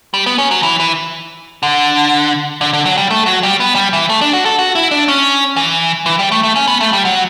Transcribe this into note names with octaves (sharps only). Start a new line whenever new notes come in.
G3
B3
C#4
F#3
E3
E3
D3
D3
D3
F#3
G3
A3
F#3
G3
B3
G3
E3
A3
D4
F#4
A4
F#4
E4
D4
C#4
E3
E3
G3
A3
A3
C#4
B3
A3
G3
F#3